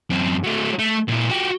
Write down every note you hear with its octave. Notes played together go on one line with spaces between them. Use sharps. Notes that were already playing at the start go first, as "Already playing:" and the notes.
F#2 C4
F#3 A3
A3
A#2 E4
F#4 G4